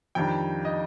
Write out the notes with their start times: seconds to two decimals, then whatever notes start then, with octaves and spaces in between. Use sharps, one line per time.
0.15 F2 D#3 G3 D4 G5
0.65 D#5